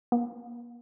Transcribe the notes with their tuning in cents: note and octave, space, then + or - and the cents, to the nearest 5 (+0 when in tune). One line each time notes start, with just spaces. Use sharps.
A#3 +40